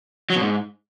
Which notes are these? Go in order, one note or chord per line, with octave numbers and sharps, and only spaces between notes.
F#3
B2
G#2